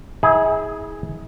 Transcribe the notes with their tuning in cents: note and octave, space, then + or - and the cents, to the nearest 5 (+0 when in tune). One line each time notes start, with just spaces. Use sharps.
E4 -40 G#4 +0